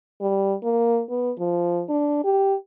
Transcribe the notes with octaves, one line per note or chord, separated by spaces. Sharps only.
G3
A#3
B3
F3
D4
G4